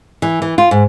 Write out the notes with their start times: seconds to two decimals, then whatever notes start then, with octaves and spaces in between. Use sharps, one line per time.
0.22 E3
0.42 E3
0.58 F4
0.71 G#2